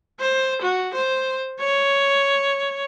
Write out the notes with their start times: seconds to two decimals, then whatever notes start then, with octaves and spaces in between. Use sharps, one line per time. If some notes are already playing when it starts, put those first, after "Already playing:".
0.20 C5
0.62 F#4
0.94 C5
1.59 C#5